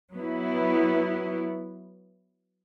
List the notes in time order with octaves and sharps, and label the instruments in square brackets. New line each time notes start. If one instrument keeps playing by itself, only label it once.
[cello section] F#3 B3 E4